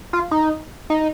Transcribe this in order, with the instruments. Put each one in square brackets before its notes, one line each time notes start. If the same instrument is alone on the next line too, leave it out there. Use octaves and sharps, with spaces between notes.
[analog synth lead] F4
D#4
D#4